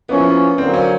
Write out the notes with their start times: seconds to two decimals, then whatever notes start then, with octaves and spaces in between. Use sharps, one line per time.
0.09 F3 A#3 B3 C#4 E4
0.57 D3 F#3 A#3 C4
0.73 C#4